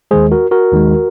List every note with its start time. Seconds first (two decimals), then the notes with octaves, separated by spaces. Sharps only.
0.11 D#2 D#3 G#3 G#4 C5
0.32 F#4 A#4
0.51 F#4 A#4
0.71 D#2 D#3 G#3